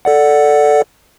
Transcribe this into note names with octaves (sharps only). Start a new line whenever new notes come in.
A4 D5 F#5